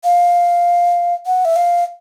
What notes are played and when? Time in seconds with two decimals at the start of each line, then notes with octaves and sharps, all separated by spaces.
0.04 F5
1.26 F#5
1.45 E5
1.56 F5